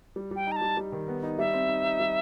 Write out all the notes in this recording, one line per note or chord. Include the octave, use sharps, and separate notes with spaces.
G3
G3 G5
D#4 A#5
A5
G3
G3
D#3
B3
D#4
G3 E5
C4
D#4
D#4
G3